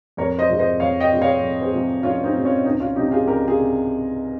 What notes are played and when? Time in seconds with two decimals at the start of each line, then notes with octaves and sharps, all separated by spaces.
0.17 F2 A#4 C#5
0.38 C5 D#5
0.48 C3 F3 G#3
0.59 C5 D#5
0.79 F2 C#5 F5
1.00 D#5 G5
1.11 C3 F3 G#3
1.22 C#5 F5
1.41 F2
1.62 G#4 C5
1.73 C3 F3 G#3
2.03 F2 C#4 F4
2.23 C4 D#4
2.34 C3 F3 G#3
2.44 C#4 F4
2.65 C#2 C4 D#4
2.80 C#4 F4
2.96 C3 F3 D#4 G4
3.11 F4 G#4
3.27 C#2 G4 A#4
3.48 F4 G#4
3.58 C3